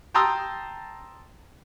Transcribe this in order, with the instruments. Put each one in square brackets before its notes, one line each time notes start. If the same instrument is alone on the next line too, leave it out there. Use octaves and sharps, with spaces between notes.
[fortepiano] G5 A5 A#5 C6 D#6 E6